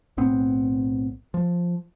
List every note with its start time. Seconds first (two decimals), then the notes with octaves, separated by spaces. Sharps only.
0.17 B1 A2 B3 C4
1.34 F3